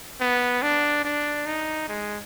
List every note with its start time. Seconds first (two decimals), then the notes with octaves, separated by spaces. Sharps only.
0.21 B3
0.63 D4
1.05 D4
1.46 D#4
1.88 G#3